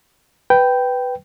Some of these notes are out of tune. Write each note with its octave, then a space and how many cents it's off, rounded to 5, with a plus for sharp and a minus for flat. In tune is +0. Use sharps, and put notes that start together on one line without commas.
B4 +5 G5 -5